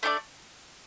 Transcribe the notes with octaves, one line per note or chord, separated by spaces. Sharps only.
A3 D4 A4 D5